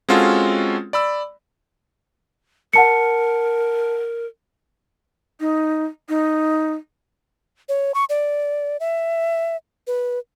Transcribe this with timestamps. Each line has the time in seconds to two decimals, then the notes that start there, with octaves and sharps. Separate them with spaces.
0.09 G#3 C4 C#4 F4 F#4 A4
0.93 D5 B5 E6
2.73 A#4 F#5 A5 C#7
5.40 D#4
6.09 D#4
7.69 C#5
7.94 C#6
8.10 D5
8.80 E5
9.87 B4